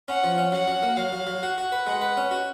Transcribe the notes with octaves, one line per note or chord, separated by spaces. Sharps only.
C#4 F#5
F3
C#4
F#3 F#5
F#3
A#3
F#3 F5
F#3
F#3
F#4 F#5
F#4
B4
G#3 F#5
B4
C#4
F#4